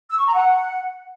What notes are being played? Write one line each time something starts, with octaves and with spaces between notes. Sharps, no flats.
E6
C#6
A#5
F#5